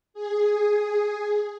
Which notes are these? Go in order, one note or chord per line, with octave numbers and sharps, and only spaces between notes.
G#4